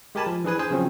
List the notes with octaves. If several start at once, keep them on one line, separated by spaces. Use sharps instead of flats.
G#3 G4 A#4 G#5 A5 B5
F3
E3 D4 G#4 B4 G#5
G#4 C5 G#5
C#3 F3 F#3 C4 C#4